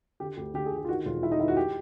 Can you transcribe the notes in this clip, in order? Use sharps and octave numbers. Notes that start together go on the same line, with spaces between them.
D3 G4
D2 G4
D3 G4
G#4
D3 G4
F4
D#3 F#4
E1 F4
D#3 E4
D#4
D#3 E4
F#4
G4